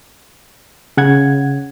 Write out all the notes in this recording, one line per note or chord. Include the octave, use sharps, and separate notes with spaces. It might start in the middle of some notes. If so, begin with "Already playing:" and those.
C#3 F#5 G#6